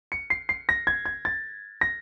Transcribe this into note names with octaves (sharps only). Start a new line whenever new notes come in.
C#7
C7
C7
A#6
G#6
G#6
A6
A#6